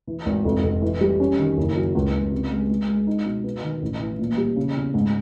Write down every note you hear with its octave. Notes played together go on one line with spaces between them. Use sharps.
E3
G#1
F1
F1
E3
G3
C#4
D#3
F#1
F#3
C#2
C#2
C3
G#3
G#3
G#3
D#4
B2
B3
D#3
A1
E3
A#2
G3
C#3
E2
G#2